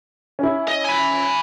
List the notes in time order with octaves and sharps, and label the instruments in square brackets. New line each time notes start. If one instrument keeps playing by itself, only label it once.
[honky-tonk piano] C#4 E4
[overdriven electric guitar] D#5
G#5 B5